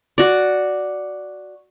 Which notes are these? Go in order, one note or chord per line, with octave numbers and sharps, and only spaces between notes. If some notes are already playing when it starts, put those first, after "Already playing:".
F#4 D5